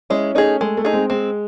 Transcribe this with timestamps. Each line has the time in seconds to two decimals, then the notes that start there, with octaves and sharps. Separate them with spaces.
0.10 G#3 C#4 E4
0.35 A3 C#4 D#4 G#4
0.61 G#3 A3
0.77 A3
0.85 D#4 G#4
0.93 G#3 C4
1.10 G#3 C4